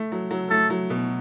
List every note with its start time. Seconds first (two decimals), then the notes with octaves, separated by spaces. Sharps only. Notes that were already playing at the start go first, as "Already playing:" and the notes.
Already playing: A3
0.12 F#3
0.31 F#3
0.50 A3 A4
0.70 F#3
0.90 B2